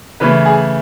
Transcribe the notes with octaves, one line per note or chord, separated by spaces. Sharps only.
C#3 E3 A3 B4
G#4